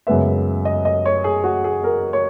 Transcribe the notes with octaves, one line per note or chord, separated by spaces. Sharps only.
F#2 C#3 G#3 B3 E5
D#5
D#5
C#5
G#4
F#4
G#4
A#4
C#5